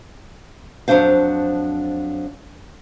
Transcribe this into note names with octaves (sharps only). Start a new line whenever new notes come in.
F2 F#3 D4 C5 F5